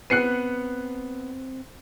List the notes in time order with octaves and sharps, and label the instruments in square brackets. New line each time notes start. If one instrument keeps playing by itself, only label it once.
[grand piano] B3 C7 [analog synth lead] C4 [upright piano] F#6 C#7 D#7